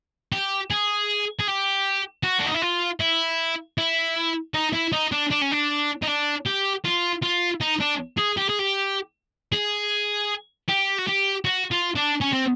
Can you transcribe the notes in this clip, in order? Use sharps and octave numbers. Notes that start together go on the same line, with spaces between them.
G4
G#4
G#4
G4
F#4
D4
D#4
E4
F4
E4
E4
D#4
E4
D#4
D4
D4
C#4
D4
D#4
D4
G4
F4
F4
D#4
D4
G#4
G4
G#4
G4
G#4
G4
F#4
G4
F#4
F4
D4
C#4
C4